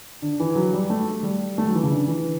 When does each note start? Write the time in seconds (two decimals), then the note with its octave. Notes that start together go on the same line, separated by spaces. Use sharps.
0.22 D3
0.40 E3
0.55 F#3
0.73 G3
0.90 A3
1.23 G3
1.58 A3
1.66 F#3
1.75 E3
1.83 C#3
1.91 D3
2.08 E3